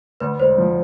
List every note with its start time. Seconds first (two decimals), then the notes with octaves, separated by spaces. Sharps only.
0.20 D2 B4
0.39 E1 C5
0.58 F3